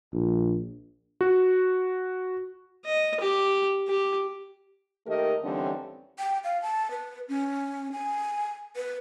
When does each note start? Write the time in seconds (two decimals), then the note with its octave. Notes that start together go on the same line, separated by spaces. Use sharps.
0.13 A#1
1.21 F#4
2.85 D#5
3.20 G4
3.88 G4
5.06 D#3 A3 A#3 G4 A#4 D#5
5.42 D#2 D3 E3 G3 C4 C#4
6.19 G5
6.44 F5
6.62 A5
6.91 B4
7.29 C#4
7.92 G#5
8.76 B4